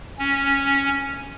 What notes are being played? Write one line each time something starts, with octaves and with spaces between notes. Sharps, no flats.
C#4